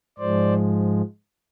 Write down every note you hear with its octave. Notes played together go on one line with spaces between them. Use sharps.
G#2 F3 G#3 C5 D5